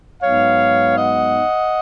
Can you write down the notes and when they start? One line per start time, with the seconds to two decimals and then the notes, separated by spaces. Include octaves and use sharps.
0.23 G#2 F#3 B3 D#4 C#5 F5
0.98 D#5 F#5